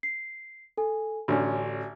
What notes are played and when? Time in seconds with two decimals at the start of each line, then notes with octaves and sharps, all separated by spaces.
0.03 C7
0.77 A4 G#5
1.28 A1 D3 C#4 F#4 D5 G#5